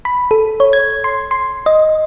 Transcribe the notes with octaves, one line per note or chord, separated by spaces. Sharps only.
B5
A4
C#5
G#6
C6
C6
D#5